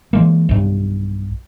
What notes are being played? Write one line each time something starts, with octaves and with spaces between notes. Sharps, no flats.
E3 G#3 A#3
B1 G2